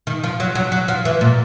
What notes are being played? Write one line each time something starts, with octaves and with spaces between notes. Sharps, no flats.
D#3
F3
F#3
F#3
F#3
F3
E3
A#2